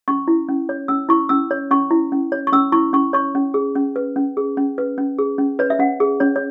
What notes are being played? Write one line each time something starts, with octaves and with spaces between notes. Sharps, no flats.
C#4 C#6
E4
C#4
C#5
C#4 E6
E4 C#6
C#4 E6
C#5
C#4 C#6
E4
C#4
C#5
C#6
C#4 E6
E4 C#6
C#4 C#6
C#5 C#6
C#4
G#4
C#4
B4
C#4
G#4
C#4
B4
C#4
G#4
C#4
B4 C#5
E5
C#4 F#5
G#4
C#4 C#5
C#5